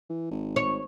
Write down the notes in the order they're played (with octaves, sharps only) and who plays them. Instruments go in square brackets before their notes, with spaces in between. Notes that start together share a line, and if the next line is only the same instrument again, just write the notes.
[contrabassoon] E3
G#1
[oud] C#5